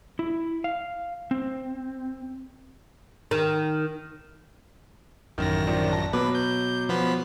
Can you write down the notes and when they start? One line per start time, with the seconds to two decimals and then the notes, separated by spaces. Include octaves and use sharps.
0.19 E4
0.64 F5
1.31 C4
3.31 D#3
5.38 A1 F#2 D#3 A#6
5.67 D#3 F3 D4
5.92 A5
6.13 B2 F#3 B4 D6
6.35 G6
6.89 F3 B3 B4